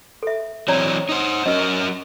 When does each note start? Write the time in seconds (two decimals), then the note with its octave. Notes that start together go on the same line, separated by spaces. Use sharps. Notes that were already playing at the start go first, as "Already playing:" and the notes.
0.23 A4 E5
0.68 E3 F#3 C4 C#5 D5 A#5
1.09 D#4 C5
1.46 F#3 C#4 A#4 D#5 E6